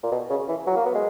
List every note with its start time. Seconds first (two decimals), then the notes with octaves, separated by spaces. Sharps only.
0.03 A#2
0.12 B2
0.30 C#3
0.48 E3
0.67 F#3
0.76 A#3
0.85 B3
0.95 G#3